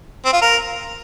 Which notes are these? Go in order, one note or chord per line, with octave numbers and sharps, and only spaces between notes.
C4
F4
A#4